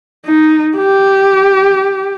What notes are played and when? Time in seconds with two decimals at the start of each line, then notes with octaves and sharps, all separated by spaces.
0.26 D#4
0.77 G4